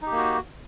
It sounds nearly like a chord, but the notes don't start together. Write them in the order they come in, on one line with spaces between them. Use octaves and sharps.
D#4 G4 A#3 F#4